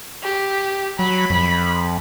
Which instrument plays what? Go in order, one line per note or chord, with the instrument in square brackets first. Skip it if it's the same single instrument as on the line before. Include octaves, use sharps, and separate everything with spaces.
[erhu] G4
[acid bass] F#3 [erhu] B5
[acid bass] F2